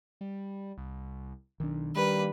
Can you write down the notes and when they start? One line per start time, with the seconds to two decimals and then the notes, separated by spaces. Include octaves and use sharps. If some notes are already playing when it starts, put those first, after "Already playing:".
0.21 G3
0.78 C2
1.60 B1 D#3 D4
1.96 G3 A#3 B4